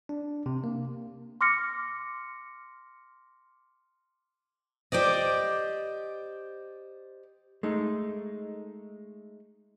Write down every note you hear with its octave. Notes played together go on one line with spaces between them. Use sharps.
D4
C3
A#3
C6 D6 F6 A#6 C#7
G4 C5 D5 D#5
G#3 A3 D#4